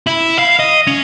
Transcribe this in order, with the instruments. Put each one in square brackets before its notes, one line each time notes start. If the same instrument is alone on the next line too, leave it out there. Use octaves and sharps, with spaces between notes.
[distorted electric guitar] E4
F5
D#5
C#4